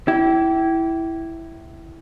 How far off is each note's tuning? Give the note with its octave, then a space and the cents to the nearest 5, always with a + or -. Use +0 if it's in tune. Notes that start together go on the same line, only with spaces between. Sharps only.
E4 +0 G4 -30